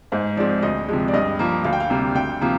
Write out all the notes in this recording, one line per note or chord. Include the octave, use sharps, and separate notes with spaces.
G#2 C5
F3 G#3 C4 D5
D2 D#5
C3 F3 G#3
D5
G2 D#5
F3 A#3
D2 F5
G5
F5
C3 G3 A#3
D2 G5
C3 F3 A#3